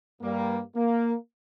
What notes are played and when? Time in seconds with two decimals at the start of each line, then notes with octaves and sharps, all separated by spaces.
0.21 G2 G3 A#3
0.75 A#3